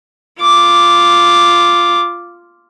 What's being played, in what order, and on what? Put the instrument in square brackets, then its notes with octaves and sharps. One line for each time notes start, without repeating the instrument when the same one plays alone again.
[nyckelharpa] F4 D6